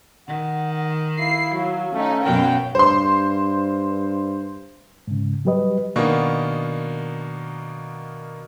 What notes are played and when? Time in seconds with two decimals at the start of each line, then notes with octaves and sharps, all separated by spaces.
0.28 D#3 F#5
1.19 E4 F5 C7
1.55 F#3 F5
1.94 A3 C#4 D#4
2.24 F#2 B2 F#3 A#4 G5
2.75 G2 C5 C6
5.08 G#2 C#3
5.45 F#3 G3 G4 B4 D#5
5.96 B2 D#3 A#3 B3 D4